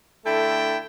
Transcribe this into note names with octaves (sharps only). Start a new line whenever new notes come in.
D3 A3 E4 A4 G5